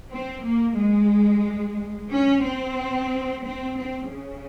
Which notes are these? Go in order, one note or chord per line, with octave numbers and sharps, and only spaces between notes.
C4
A#3
G#3
C#4
C4
C4
C4
C#3